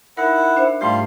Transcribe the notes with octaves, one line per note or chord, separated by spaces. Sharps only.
D#4 E4 A#4 F#5
D4 C5 E5
G#2 G3 A3 F4 G4 C6